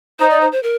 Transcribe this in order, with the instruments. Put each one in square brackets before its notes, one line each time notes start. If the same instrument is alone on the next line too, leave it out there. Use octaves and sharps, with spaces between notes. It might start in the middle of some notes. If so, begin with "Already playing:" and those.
[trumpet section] D#4 [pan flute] C5
[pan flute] D5
C5
C5
A#4